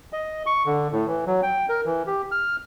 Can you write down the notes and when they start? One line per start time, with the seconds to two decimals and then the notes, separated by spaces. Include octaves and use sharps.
0.13 D#5
0.46 C#6
0.66 D3
0.92 A2
1.07 E3
1.27 F#3
1.43 G5
1.69 A#4
1.85 E3
2.07 G4
2.32 F6